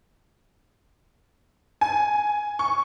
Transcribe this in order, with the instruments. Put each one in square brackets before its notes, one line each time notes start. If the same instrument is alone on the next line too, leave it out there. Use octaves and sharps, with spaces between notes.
[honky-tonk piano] G#5
C#6